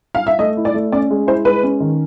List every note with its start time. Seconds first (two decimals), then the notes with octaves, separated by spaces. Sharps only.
0.15 F5
0.27 E5
0.39 A3 D#5
0.57 E4
0.65 D5
0.74 A3
0.92 C#4 D5
1.10 G#3
1.27 E4 C5
1.45 G#3 B4
1.63 C#4
1.80 D#3